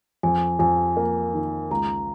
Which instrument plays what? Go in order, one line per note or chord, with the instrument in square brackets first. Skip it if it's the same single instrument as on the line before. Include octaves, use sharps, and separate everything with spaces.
[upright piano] F2 [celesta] G#5
[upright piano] F2 [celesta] G#5
[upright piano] A#3
D#3
[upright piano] C#2 [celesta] A#5